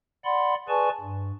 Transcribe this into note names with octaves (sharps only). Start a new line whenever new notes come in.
D5 F#5 B5 C6
G#4 B4 D5 G#5 A5 C#6
G2